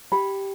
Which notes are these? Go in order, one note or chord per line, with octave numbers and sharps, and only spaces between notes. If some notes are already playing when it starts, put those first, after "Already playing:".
G4 B5